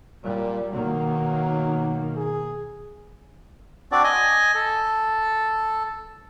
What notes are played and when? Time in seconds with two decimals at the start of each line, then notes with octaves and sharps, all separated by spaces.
0.24 A#2 G3
0.72 B2 D#3 F#3 A#3
2.16 G#4
3.92 C4 D4 F#4 D5
4.04 D#5 G#5
4.55 A4